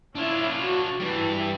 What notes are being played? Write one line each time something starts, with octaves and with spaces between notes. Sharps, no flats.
C#4 D4 E4 F4
F#4
G2 E3 G3 E4